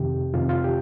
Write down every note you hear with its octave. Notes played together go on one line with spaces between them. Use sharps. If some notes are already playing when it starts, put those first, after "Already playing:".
Already playing: F2 C3 D#3 G4
F2 C3 D#3 F4
F4
G4